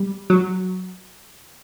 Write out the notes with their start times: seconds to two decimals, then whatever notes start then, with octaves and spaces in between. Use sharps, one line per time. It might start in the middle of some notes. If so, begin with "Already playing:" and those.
Already playing: G3
0.30 F#3